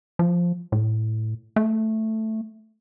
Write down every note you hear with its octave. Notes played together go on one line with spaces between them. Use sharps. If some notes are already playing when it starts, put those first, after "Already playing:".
F3
A2
A3